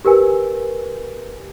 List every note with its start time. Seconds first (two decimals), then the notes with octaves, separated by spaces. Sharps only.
0.05 G4 A#4 B4 G#5